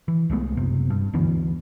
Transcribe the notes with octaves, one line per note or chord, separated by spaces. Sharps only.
E3
C2 G#3 A3 B3
F#1 C3
G2
D2 D3 E3 B3